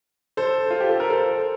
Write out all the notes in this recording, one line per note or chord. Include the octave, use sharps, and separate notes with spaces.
A4 C5
F4
G4
A4
A#4
A4 C5